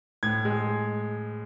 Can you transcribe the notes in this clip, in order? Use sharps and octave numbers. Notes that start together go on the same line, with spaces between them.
A2 G#6
G#3